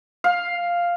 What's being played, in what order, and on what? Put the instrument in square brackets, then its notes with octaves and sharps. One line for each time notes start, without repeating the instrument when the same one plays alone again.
[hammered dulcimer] F5